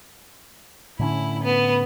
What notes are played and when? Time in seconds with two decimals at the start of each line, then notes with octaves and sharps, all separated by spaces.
0.99 A2 D3 C#4 E4
1.43 B3